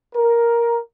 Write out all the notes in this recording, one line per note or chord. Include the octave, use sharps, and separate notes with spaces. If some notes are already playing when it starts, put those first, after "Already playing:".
A#4